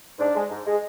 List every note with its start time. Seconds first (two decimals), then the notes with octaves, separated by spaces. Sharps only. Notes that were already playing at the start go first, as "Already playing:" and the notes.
0.19 G#2 D4
0.36 G#3
0.51 G#2
0.67 G#3